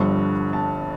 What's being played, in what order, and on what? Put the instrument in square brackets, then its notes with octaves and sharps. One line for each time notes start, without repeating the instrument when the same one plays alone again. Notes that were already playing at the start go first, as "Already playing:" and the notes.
Already playing: [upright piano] G1 G2 D3 F3 C#6
A5